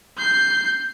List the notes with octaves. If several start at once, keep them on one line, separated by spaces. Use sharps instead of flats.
G6 C7